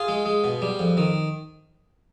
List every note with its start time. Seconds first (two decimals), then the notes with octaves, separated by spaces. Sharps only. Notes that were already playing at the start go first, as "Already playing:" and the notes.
Already playing: F4 G#4
0.08 G#3
0.26 G#3
0.44 B2
0.62 G3
0.79 F2
0.97 D#3